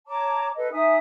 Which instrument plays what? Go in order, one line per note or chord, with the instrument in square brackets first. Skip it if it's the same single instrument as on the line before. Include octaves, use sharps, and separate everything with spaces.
[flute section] C#5 A5 A#5 D6
A4 B4 D#5
D#4 E5 G#5 D#6